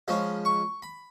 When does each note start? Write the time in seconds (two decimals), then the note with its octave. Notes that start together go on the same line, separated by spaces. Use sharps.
0.08 F3 G#3 C#4 B5
0.45 C#6
0.82 B5